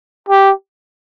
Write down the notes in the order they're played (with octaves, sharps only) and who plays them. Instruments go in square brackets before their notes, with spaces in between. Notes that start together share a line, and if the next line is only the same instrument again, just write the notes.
[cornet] G4